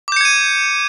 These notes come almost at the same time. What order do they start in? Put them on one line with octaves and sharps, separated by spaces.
D6 G6 C#7 G#6 D#7